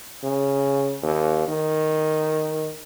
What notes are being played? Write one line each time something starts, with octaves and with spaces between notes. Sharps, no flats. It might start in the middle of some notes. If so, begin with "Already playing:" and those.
C#3
D#2
D#3